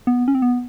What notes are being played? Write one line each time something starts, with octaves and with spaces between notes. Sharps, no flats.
B3
C#4
C4
B3